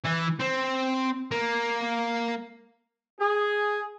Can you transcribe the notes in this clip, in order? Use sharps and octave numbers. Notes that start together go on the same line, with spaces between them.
E3
C4
A#3
G#4